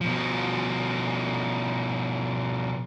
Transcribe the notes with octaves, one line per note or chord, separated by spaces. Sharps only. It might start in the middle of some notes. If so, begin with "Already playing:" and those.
B2 F3